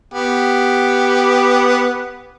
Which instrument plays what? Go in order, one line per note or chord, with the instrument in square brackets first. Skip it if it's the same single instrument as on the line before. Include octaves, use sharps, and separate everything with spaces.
[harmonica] B3 G4